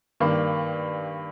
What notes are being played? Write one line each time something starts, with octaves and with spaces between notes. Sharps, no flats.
G2 D#3 A#3